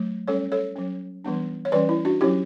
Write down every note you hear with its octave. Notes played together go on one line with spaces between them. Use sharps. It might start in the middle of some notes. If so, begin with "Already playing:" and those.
Already playing: F#3 A3
G3 C#4 A4 C#5
A4 C#5
F#3 C#4
E3 G3 B3 D4
C#5
E3 G3 C#4 B4 D5
E4
D4 F#4
F#3 C#4 E4 G4